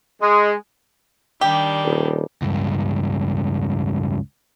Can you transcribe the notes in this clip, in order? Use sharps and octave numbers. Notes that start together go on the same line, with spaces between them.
G#3
D#3 G3 D4 G4
D#1
C#2 G2